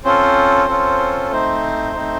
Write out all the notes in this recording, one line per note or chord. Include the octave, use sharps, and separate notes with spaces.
C4 C#4 F4 A4 C5
C#4 F4 A4
A3 C4 D#4 C5
A3 C4 D#4